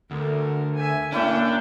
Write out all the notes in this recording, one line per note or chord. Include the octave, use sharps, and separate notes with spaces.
D2 A4 A#4
E5 G#5
A#3 C#4 D4 E4 C#5 G5